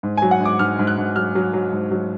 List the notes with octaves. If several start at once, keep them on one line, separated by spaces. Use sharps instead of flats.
G#2
G#5
F#3
F#5
G#2 D6
G#2 F6
G#2
F#6
G#2
F#3 F6
F#3
F#3
G#2
F#3